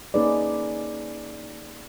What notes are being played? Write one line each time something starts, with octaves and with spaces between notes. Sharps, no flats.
A#3 C#4 D#4 G#4 B4 D5